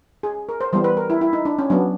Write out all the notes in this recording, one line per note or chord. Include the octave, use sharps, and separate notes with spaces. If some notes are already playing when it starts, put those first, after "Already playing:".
G#4
A#4
C5
E3 G3 B3 C5
B4
A#4
E4
E4
D#4
D4
C#4
F#3 B3 D4